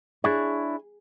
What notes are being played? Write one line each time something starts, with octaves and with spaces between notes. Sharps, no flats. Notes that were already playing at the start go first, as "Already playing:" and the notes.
D4 E4 G#4 C#5